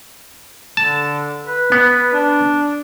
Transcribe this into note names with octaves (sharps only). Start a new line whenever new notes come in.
D3 A5
B4
B3
D4